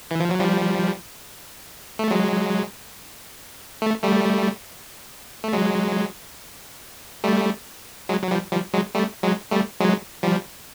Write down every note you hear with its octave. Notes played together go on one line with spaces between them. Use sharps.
E3
F3
F#3
F3 G3
A3
F#3 G#3
A3
G3 A3
A3
F#3 G#3
G3 A3
F#3 G#3
F#3
F3 G3
F3 G3
F#3 G#3
G3 A3
F#3 G#3
G3 A3
F#3 G#3
F3 G3